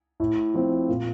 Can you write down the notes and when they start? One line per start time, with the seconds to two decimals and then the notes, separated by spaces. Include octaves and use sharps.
0.20 A2
0.54 F3 C4
0.88 A#2